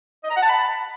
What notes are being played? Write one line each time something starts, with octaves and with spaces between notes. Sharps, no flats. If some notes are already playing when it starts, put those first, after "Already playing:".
D#5
A#5
F#5
A5
B5